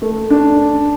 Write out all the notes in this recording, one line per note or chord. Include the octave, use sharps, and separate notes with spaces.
A3
D4